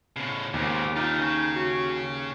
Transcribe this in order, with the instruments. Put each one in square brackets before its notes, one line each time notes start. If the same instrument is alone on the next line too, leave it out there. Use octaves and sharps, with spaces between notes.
[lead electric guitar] A2 C#3
[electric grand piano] D#2 [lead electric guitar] G#2 C#3 [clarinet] D6
[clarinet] D#4 [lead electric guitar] F4 E5
[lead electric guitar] C#3 C#4
[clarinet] F#4